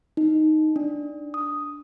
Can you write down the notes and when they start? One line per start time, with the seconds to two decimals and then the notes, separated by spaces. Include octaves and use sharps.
0.17 D#4
0.76 D4
1.34 D#6